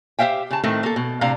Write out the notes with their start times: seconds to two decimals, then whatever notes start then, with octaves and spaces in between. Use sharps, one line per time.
0.19 G4 C5 E5 F5 G5
0.51 C#3 A5
0.64 A2 D#3 A3 C4
0.83 A#3 A4
0.96 B2
1.21 A2 C3 D4 F5 A#5